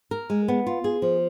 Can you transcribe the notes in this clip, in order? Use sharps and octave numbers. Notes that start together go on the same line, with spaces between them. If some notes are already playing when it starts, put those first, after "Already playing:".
A#4
G#3
B3
F4
G#4
F3